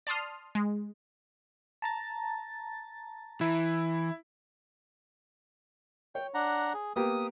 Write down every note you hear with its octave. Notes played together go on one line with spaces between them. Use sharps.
D5 A5 C6 D#6 F6
G#3
A5 A#5 A6
E3 E4
C#5 G5
D4 F#5 A#5
G#4
A#3 B3 G4 D#6